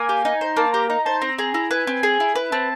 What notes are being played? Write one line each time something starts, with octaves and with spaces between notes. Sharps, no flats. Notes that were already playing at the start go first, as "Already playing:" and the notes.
Already playing: A#3 G#5
G4
D#4
C5
A#3 A5
G4 A#5
D#4 A#5
C5 A5
C4 A#5
G#4 A#5
E4 A#5
B4 G#5
C4 G#5
G#4
E4
B4
C4 A5